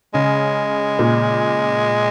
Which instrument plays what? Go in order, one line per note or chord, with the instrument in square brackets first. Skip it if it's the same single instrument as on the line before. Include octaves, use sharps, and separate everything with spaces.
[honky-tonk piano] C#3 [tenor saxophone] G#3
[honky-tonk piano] A#2